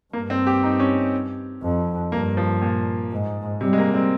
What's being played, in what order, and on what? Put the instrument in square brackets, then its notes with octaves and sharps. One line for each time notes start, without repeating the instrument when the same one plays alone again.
[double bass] G2 [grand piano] A#3
[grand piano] C4
G4
D#4
C#4
[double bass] F2
[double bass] G2 [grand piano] A#3
[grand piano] F3
A#2
[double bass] G#2
[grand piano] C3 [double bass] G3
[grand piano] G#3
A#3
C4